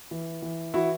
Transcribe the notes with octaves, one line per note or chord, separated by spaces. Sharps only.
E3
E3
E3 E4 F#4